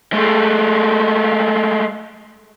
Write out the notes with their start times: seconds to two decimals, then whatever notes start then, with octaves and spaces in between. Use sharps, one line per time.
0.13 G#3 A3